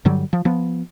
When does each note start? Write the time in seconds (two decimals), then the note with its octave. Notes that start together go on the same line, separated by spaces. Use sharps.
0.05 G2 D3 F#3 G3
0.33 F3
0.45 F3 B3